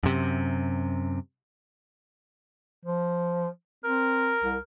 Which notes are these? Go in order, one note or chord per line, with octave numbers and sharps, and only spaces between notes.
F#2 C3
F3
C4 A#4
C2